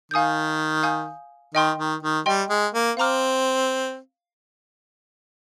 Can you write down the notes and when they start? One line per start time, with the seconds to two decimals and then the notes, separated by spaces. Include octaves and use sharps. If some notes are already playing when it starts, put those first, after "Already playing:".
0.11 D#3 F5 G#5 D#6 G6
0.83 F5 G#5 D#6 G6
1.54 D#3 D#5 G5 C6
1.78 D#3
2.03 D#3
2.26 G3 D#5 G5 C6
2.50 G#3
2.74 A#3
2.97 C4 F5 A#5 D6 F6